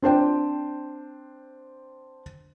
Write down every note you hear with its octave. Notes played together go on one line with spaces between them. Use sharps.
C4 D4 C5 G5